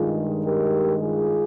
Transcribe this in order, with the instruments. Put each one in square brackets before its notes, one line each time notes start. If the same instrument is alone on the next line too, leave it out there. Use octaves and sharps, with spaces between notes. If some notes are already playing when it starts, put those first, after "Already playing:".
Already playing: [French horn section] G2 D#3 G#3 F4 G#4
G4 A#4
F4 G#4